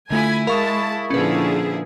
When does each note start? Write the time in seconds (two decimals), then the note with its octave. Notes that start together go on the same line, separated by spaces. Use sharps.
0.11 D3 A3 E4 F4 G#5 B5
0.47 G#3 A#4 F5 A5 B5 C#6 D#6
1.11 A#2 D3 F3 C#4 E4 G#4 B4